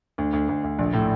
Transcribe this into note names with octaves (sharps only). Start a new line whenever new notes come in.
D2
D2
D2
D2
A#1
A2